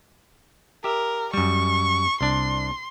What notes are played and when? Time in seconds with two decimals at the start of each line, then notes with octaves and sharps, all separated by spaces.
0.84 G4 A#4 E5
1.34 F#2 G3 C#6
2.21 C2 D4 C6